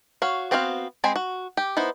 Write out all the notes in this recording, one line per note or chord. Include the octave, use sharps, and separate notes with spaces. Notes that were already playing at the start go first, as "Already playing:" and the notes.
F#4 C#5 F5
B3 C4 F#4 C5 F5
G#3 C4 C5 G#5 B5
F#4
G4
B3 D#4 E4 C5